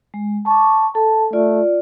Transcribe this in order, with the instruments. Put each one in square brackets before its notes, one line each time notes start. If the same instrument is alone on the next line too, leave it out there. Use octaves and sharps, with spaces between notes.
[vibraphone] G#3
[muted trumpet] A5 [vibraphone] C#6 D6
[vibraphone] A4 [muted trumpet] A5
[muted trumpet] A3 [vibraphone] F4 D5